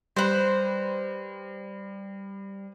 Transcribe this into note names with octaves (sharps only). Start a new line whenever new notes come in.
G3 B4 C5